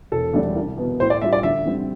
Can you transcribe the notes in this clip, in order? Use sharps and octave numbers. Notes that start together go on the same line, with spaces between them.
E1 A4
D2 D3 G3 D4
C2
B2 B3
A2 C5
D5
G3 D4 F4 E5
D5
D2 E5
D3 G3 C4